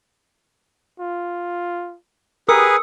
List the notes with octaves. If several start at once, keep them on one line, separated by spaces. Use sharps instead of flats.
F4
G4 G#4 A#4 B4 D#6 E6 C#7